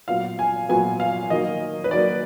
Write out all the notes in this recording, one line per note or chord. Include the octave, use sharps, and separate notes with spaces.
A#2 F#3 B3 F5
G#5
A#2 F#3 B3 G#5
F5
D#3 F#3 A#3 D#5
B4
D#3 F#3 A#3 D5